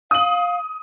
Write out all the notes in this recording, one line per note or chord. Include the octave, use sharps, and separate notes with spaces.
F5 D#6 F#7